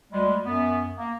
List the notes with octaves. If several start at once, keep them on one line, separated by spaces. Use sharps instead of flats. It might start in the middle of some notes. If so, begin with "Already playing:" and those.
D2 G3 G#3
F#2 B3
A#3